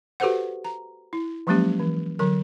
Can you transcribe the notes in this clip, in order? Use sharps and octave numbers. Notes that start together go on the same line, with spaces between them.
F#4 G4 A4 B4 C5 F#5
A#5
E4
F3 F#3 G#3 A#3 C#4 G4
E3
D3 F#3 A#4